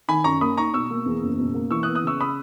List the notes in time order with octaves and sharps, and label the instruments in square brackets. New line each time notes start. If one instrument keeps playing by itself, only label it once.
[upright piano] D#3 [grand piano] G#5 B5
[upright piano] F#2 [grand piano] A#5 C#6
[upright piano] A#3 [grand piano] B5 D#6
[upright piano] D#4 [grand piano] A#5 C#6
[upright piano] B2 [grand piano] C#6 E6
[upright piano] A#3
E2
F#1
B2
A#3
[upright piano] E3 [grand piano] C#6 E6
[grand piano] D#6 F#6
[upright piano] B3
[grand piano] D#6 F#6
[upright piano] C#3 [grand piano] C#6 E6
[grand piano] B5 D#6